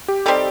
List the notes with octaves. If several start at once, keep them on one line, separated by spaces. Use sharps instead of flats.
G4
G3 C4 D#4 G4 A4